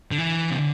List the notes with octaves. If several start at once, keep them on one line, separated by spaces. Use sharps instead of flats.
D3
E3
C3
D3